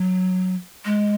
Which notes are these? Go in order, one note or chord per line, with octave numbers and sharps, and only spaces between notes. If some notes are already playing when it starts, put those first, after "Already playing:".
Already playing: F#3
G#3